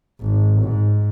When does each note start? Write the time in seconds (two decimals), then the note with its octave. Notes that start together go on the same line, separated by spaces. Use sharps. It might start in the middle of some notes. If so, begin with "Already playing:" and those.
0.21 G#1
0.62 G#2